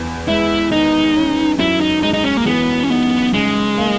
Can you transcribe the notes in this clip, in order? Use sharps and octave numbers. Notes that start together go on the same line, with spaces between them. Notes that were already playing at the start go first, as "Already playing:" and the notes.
Already playing: E2
G#3 E4
D#3 D#4
C#4
F#2 E4
D#4
G#3 D#4
D#4
C#4
A#3
E3 B3
C#4
B3 D#4
C#3 G#3
A#3